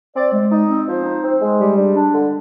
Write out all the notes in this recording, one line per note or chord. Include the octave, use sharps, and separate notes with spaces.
C4 D5
G#3
D#4
C4
F3 C5
D#4
C4
G#3
G3
D4
D4
D3